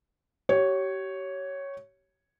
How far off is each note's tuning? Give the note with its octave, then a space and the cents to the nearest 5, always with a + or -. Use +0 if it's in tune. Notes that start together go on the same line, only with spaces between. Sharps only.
G4 -35 C#5 +0